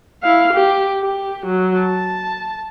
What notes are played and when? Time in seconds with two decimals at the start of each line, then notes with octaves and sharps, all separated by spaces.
0.23 E4 F5
0.53 G4
1.02 G4
1.47 F#3
1.80 A5